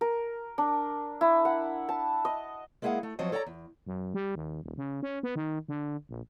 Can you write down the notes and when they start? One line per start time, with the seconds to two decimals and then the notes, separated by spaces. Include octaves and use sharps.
0.01 A#4
0.58 D4
1.21 E4
1.45 F#5
1.89 A5
2.25 D#5
2.82 G#3 A#3 E4 G#4 F5 F#5
3.03 A3
3.19 F3 F#3 C4 C5 C#5 D#5
3.32 A4 C#5 D5 F#5 A#5
3.46 E2
3.86 F#2
4.14 G3
4.35 D#2
4.63 D#1
4.77 C#3
5.03 C#4
5.23 B3
5.36 D#3
5.68 D3
6.09 A#1